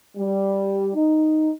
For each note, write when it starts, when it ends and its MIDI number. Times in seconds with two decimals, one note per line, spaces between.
0.17 0.90 55
0.94 1.49 63